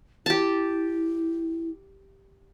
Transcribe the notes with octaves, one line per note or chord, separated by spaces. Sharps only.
E4 G4 A5